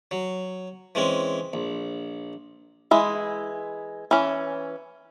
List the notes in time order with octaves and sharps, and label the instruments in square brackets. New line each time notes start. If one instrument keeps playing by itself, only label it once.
[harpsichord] F#3
E3 G#3 C4 C#4
A#1
[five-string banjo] E3 G#3 E4
E3 C#4